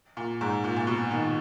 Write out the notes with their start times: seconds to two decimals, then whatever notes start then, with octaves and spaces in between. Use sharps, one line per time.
0.17 A#2
0.41 G#2
0.64 A#2
0.76 A#2
0.87 B2
1.11 D#3